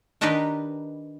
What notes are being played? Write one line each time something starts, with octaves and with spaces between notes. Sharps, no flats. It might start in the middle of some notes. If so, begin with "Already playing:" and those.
D#3 D4 D#4 G4 A#4 B4